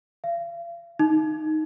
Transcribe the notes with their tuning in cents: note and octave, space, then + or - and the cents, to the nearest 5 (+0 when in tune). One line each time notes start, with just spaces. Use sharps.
F5 -40
D#4 +0